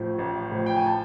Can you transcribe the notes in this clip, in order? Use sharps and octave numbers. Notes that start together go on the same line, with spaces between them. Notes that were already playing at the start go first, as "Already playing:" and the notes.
Already playing: A1 A2 F3
A1
A2 F3
G5
G#5
A5